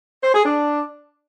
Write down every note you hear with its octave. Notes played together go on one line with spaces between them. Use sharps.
C5
G#4
D4